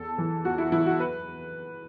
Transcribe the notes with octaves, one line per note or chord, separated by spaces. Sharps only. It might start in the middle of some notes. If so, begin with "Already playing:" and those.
Already playing: E2 A4
E3
E2 F#4
E4
E3 E4
F#4
B4